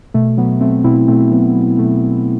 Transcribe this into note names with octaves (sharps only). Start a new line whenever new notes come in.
B2 A3
F#3 B3
F#3 A3 C4
B2 C4 E4
B2 A3 C4
F#3 B3
F#3
B2 A3